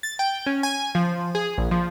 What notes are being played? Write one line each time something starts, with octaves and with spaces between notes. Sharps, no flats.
A6
G5
C#4
G#5
F3
G#4
A#1
F3